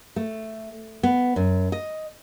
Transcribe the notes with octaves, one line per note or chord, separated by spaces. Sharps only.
A3
B3
F#2
D#5